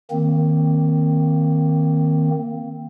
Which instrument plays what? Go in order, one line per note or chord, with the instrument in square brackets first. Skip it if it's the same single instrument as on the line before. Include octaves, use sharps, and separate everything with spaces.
[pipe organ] D#3 A#3 C4